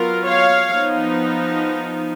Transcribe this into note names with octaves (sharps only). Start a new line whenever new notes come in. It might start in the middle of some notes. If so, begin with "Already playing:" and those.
Already playing: F#3 B3 F4 A#4
C#5 F5
F3 B3 D#4